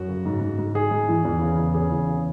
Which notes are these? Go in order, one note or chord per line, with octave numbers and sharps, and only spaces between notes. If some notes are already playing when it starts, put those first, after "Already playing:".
Already playing: F#2 F#4
C#3
G#2
G#2
G#2
G#2 G#4
G#2
E3
E2
C#3
E2
C#3 G#4
E2
C#3